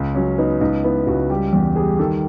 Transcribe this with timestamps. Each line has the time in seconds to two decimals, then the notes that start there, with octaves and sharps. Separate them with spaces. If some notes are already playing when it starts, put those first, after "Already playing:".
Already playing: C#2
0.15 F#3 C#4
0.38 B3 D#4
0.61 C#2 D#4
0.84 B3 E4
1.07 C#2 F#4
1.30 G3 G4
1.53 E2 G4
1.76 G3 G#4
1.99 D#3 A4